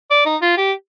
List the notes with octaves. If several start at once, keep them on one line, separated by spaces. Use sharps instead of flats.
D5
D#4
F4
G4